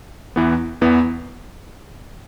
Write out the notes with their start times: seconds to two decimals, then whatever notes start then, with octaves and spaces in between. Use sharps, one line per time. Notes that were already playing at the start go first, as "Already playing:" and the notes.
0.36 E2 E3 B3
0.81 E2 E3 B3